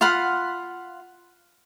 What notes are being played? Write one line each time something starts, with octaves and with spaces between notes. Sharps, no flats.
F4 F5 F#5 B5